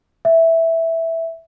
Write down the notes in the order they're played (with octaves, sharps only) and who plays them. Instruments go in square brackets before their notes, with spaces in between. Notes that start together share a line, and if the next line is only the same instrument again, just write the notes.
[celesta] E5